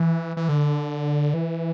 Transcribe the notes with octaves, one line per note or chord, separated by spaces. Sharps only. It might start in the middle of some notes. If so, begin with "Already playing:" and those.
Already playing: E3
E3
D3
E3